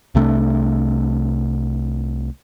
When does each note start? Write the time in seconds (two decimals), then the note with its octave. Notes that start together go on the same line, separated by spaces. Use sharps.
0.15 C2 C3 A3 D4